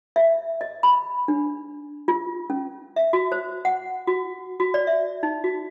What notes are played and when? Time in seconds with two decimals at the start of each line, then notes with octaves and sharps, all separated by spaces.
0.16 E5
0.61 D#5
0.83 B5
1.28 D4
2.08 F4
2.50 C#4
2.96 E5
3.13 F#4
3.32 C5
3.65 F#5
4.07 F#4
4.60 F#4
4.74 D5
4.87 E5
5.23 D#4
5.44 F#4